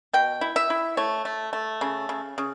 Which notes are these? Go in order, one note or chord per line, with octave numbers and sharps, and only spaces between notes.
B2 G5
E4
E5
E4
A3 C#5
A3
A3
C#3
C#3
C#3